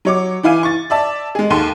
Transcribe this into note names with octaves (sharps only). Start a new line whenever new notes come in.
F#3 C#5 D6
E3 E4 F5 G#5
C#6 A6
D5 E5 A5
G#3 G#4
D#2 A4 C6 D#7